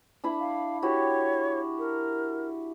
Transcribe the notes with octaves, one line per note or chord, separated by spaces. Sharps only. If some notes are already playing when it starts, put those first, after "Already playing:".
D4 E4 B5
F5
E4 F#4 G4 C#5
A#4